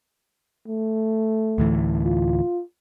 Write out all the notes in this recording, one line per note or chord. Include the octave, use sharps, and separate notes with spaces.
A3
D2 A2 E3
F4